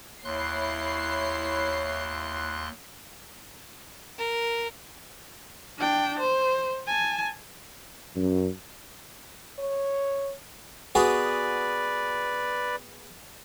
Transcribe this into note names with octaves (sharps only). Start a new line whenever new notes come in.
D#2 E4 C#5 C6 F#6 C7
A#4
D4 G5
C5
G#5 A5
F#2
C#5
B3 F#4 G#4 B4 D5